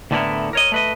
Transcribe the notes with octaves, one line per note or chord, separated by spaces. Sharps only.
D2 A2 D3 B3 E4 A#4
A#4 C#5 D#5
A3 B4 D#5